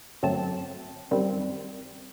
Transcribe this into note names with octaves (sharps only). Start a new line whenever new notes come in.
G1 F#2 F#3 A3 C4 A5
F#2 D#3 G3 C4